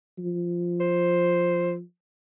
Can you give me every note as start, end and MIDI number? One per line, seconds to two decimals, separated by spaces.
0.18 1.82 53
0.80 1.72 72